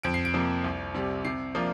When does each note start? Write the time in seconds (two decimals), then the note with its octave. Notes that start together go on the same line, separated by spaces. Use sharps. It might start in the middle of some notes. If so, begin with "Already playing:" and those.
0.03 F2 D7
0.14 C7
0.25 D7
0.34 C3 F3 A#3
0.64 C2
0.94 C3 G3
1.25 C3 C7
1.55 F3 A#3 D4 F4